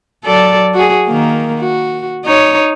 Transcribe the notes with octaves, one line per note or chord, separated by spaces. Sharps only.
F#3 A4 D5
F#4 G#4
D#3 A#3
F#4
D#4 C#5